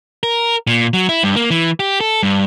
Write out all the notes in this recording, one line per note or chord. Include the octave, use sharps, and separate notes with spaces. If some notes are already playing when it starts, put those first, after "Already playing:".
A#4
A#2
F#3
E4
G2
A#3
E3
G4
A4
G2